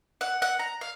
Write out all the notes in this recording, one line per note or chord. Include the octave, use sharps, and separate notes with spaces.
F#5
F#5
A#5
F5